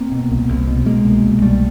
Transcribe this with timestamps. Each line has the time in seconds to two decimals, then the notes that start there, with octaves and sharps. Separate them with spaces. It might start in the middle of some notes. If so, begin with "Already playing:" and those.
Already playing: A#3 C4
0.12 B2
0.31 C2
0.49 C2
0.67 B2
0.86 C2 G#3 A#3
1.05 B2
1.23 C2
1.41 B2 G3 A3